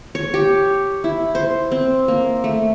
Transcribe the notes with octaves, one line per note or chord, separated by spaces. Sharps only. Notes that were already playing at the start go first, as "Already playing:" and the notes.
C#5
G4
E4
C5
C4
A#3
A3